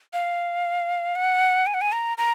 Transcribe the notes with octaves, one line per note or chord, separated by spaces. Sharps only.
F5
F#5
G#5
F#5
G#5
A#5
A#5